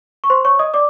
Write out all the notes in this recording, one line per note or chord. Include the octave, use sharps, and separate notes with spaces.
C#6
C5 C6
C#5 C#6
D#5 D#6
D5 D6